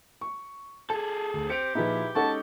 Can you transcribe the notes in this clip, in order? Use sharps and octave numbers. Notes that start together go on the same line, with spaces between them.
C#6
G#4 A4 A5
D2
C4 G4 C#7 D7 F7
A#2 F3 D#4 E4 G#4 B4
G#3 C#4 D#4 A4 F#5 A5 C#6